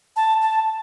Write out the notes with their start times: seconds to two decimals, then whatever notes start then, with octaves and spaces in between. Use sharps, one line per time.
0.16 A5
0.42 A5